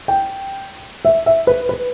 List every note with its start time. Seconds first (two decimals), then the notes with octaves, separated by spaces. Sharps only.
0.08 G5
1.05 E5
1.26 E5
1.47 B4
1.69 B4